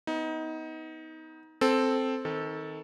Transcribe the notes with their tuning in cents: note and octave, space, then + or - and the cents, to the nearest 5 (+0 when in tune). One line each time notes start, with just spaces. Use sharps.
B3 +15 D#4 +25
C4 +0 A4 -5
D#3 +20 A4 +0